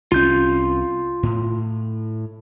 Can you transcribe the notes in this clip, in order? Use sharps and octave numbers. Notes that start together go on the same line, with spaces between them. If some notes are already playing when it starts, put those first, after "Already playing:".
C2 C#4 F4 G6
A2